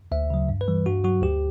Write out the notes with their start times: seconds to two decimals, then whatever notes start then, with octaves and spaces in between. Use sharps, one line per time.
0.12 D2 E5
0.30 C#3 F#3
0.49 G2
0.61 B4
0.68 E3 G3
0.86 G2 F#4
1.04 F#3 F#4
1.22 D2 G4